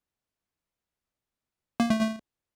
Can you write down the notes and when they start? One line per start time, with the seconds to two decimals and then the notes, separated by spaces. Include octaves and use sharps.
1.80 A#3
1.90 A3
2.01 A3